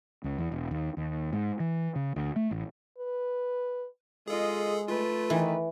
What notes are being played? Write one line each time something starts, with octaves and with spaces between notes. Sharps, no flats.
C#2
E2
E1
D#2
D#2
G#2
E3
C#3
D2
A3
A1
B4
G#3 F4 G#4 A4 D#5
A3 F4 B4
D#3 E3